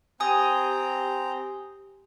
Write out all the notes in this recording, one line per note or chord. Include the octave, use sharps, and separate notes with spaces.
C4 G4 G5 G#5 A#5 D#6